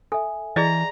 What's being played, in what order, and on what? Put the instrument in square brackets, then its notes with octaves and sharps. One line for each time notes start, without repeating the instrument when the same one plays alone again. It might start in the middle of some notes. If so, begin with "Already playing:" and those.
[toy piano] A4 [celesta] E5 G#5
[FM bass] E3 [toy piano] G#4 D5 D#5 [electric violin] A#5